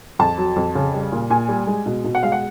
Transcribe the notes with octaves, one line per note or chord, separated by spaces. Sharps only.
F2 A5
F#3
F2
C#3
G3
A#2
A#2 G#5
G3
G#3
B2
B2
F#5
G#3 F5
F#5